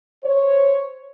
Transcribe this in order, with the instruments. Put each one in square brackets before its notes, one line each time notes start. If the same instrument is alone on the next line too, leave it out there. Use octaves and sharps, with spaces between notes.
[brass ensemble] C5 C#5